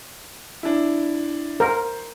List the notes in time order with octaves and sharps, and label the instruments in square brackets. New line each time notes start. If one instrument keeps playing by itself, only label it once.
[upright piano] D4 E4
[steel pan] A#4 [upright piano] C5